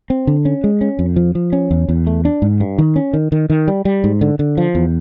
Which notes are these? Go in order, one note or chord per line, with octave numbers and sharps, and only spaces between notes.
C4
D3
C#4
G#3
C#4
F2
F3
F3
C#4
E2
E2
A3
D4
G#2
G2
D#3
C#4
D#3
D#3
D#3
G3
G3
G#2
D3
D3
F3
E2